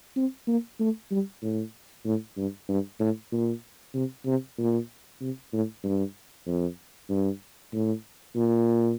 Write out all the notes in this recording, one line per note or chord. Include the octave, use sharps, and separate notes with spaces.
C4
A#3
A3
G3
A2
A2
G2
G2
A2
A#2
C3
C3
A#2
C3
A2
G2
F2
G2
A2
A#2